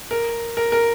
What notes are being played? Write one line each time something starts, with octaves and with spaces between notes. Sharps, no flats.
A#4
A#4
A#4